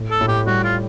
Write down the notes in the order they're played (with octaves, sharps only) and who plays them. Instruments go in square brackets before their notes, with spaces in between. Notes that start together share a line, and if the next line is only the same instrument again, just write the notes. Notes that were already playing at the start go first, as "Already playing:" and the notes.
Already playing: [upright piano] A2
[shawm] A4
[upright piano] A2
[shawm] G4
[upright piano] G3 [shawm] F#4
[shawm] F4